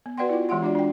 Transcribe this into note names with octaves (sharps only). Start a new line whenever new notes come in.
B3
F#4 B4 D5 F#5 G5 C6
E4 F4
E3 G#3 G4 F#5 C6
D4 F4 F#4 D5
D4 G5